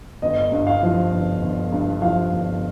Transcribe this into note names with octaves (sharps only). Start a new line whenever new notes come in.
G1 D#5
G2
F5
F3
G1
G1
G2
F3 F5
G1